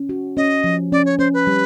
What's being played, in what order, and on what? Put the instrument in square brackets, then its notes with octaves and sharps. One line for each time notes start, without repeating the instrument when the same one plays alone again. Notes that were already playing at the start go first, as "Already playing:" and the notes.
Already playing: [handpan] C#4
F#4
[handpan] C#4 [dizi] D#5
[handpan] F3
[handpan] C#4 [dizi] D5
[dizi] C#5
[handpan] C#4 [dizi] C5
[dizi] B4
[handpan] G3